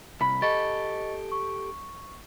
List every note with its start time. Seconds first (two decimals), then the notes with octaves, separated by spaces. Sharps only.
0.21 C2 B5
0.42 G4 A4 D#5 C#6 A6
1.32 C#6